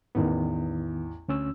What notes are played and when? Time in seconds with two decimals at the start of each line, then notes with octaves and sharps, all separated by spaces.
0.15 A1 E2 D#3 B3
1.28 D2 C#4 E6